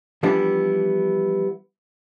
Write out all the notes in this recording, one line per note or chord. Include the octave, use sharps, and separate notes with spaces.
E3 F3 G3 B3 D4 E4